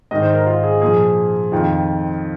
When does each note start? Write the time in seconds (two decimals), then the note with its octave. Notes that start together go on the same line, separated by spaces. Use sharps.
0.11 G#2 D#3 D#5
0.22 C5
0.34 A#4
0.46 F4
0.64 G#4
0.81 A#2 F3 G#4
1.52 F2 D#3 F4